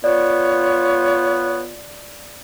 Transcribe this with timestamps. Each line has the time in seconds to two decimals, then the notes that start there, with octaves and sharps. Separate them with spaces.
0.04 B3 F4 C#5 D5